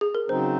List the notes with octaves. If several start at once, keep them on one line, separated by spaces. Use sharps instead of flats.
G#4
A#4
C#3 F#3 C4 D#4 C5